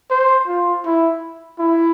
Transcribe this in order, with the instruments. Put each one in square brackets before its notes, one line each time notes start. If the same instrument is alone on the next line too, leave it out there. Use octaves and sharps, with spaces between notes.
[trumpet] C5
F4
E4
E4